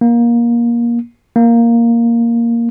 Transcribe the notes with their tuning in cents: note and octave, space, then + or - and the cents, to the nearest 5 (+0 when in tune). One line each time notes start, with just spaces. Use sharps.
A#3 +20
A#3 +0